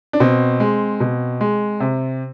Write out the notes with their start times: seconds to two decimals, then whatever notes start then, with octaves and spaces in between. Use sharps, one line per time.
0.13 D4
0.20 B2 C4
0.60 G#3
1.00 B2
1.41 G#3
1.80 C3